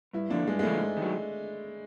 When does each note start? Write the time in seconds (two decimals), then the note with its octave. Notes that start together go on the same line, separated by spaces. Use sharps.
0.13 G2 E4
0.30 D3 F3 A#3 D4
0.47 G2 G#3
0.59 G#3
0.63 D3 F3 A3 A#3
0.80 G#2
0.97 D#3 F#3